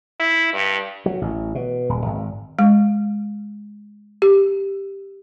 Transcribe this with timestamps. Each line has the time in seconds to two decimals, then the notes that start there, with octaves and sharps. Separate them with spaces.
0.20 E4
0.54 G2
1.06 F#3
1.22 A1
1.55 B2
1.89 D#1
2.06 G#1
2.59 G#3
4.22 G4